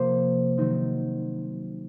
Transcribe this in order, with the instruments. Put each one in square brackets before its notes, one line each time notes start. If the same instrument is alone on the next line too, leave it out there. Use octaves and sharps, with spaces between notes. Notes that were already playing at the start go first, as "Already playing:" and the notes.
Already playing: [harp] C3 F3 A#3 C5
D#3 F#3 C4 D#4